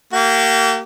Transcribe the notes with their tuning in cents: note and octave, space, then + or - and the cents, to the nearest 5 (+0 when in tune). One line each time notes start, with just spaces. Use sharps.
A#3 -30 G4 -40